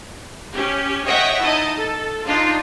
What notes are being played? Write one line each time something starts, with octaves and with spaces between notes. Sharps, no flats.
C#4 G4
C#5 D#5 E5 F#5 G5 C#6
D#4 E4 D#5 A5
A4
D4 D#4 F4